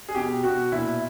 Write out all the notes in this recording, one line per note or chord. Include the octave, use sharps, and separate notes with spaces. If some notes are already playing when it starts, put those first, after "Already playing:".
G#4
B2 G4
B2 F#4
A#2 E4